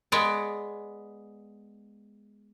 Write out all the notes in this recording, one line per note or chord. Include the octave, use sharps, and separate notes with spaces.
G#3 B3 D5